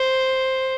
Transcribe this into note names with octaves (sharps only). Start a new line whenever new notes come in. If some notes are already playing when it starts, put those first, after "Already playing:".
Already playing: C5